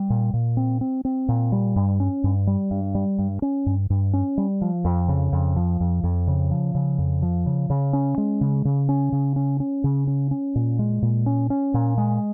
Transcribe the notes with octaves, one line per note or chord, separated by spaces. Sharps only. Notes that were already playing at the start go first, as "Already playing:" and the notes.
Already playing: G3
A#2
A#2
C4
C4
C4
A#2
G3
G2
C#4
G2
G3
G2
G3
G2
C#4
G2
G2
C#4
G3
F3
F2
C#3
F2
F3
F2
F2
C#3
F3
C#3
F2
F3
C#3
C#3
C#4
G#3
C#3
C#3
C#4
C#3
C#4
C#4
C#3
C#4
C#4
A#2
G#3
A#2
C#4
C#4
A#2
G#3